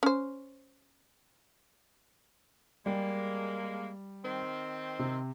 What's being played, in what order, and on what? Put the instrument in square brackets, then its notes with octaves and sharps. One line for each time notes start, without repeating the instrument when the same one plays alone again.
[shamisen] C#4 C5
[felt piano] G3 [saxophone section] G#3 A#3
[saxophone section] D#3 C4
[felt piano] C3